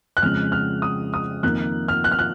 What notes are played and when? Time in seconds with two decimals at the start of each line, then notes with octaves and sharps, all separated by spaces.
0.17 F#6
0.22 F2 C#3 G#3 F6
0.52 F6
0.82 D#6
1.14 D#6
1.43 F2 D#3 A#3 F#6
1.88 F6
2.04 F#6
2.12 F6
2.19 F#6